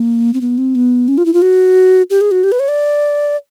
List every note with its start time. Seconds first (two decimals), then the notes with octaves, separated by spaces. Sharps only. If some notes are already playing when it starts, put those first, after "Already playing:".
Already playing: A#3
0.34 C4
0.41 B3
0.58 C4
0.75 B3
1.08 C#4
1.18 F4
1.26 E4
1.33 F4
1.42 F#4
2.10 G4
2.21 G#4
2.31 F#4
2.44 G4
2.52 B4
2.60 C#5
2.68 D5